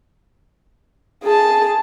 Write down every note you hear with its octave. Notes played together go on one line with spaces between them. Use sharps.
G#4 A5